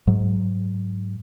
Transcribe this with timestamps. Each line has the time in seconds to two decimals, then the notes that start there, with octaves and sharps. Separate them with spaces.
0.07 G#2 F#3